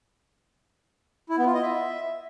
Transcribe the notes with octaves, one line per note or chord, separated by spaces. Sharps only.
E4
B3
F4
D#5
E5